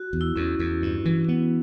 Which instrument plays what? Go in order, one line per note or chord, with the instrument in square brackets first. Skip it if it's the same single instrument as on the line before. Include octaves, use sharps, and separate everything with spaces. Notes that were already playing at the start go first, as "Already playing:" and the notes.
Already playing: [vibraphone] F#4
[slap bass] E2
[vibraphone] E4
[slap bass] E2 [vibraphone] C#4
[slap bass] E2
G2
E3
B3